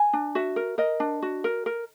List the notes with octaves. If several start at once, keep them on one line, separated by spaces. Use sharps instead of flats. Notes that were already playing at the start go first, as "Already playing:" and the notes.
Already playing: G#5
D4
F#4 E5
A#4
A#4 D#5
D4
F#4
A#4
A#4